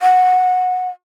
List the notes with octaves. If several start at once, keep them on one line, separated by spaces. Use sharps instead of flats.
F#5